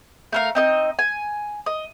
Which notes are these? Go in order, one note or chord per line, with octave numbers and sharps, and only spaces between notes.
A3 A#4 F5
C4 D#4 D#5
G#5
D#5